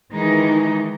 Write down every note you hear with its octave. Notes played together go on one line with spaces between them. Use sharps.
D#3 E3 G#3 D#4